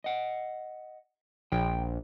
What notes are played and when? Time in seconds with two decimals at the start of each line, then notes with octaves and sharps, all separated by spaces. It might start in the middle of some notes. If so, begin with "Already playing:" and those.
0.04 D#5 F#5
1.52 A#1 G5